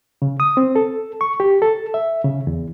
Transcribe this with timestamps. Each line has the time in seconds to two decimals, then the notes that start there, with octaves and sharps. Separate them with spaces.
0.22 C#3
0.40 D#6
0.57 C4
0.76 A4
1.21 C#6
1.40 G4
1.62 A4
1.94 E5
2.24 C#3
2.47 E2